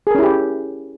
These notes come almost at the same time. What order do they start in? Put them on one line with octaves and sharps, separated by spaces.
G#4 A#4 C#4 E4 G4